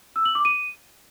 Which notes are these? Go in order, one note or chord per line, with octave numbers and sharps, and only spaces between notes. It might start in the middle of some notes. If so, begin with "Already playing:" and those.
E6
F#7
D6
D#7